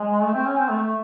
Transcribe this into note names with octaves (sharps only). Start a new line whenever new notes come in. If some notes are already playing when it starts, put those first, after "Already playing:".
Already playing: G#3
A3
C4
C#4
C4
A3